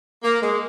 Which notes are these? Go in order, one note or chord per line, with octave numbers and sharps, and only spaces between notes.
A#3
G#3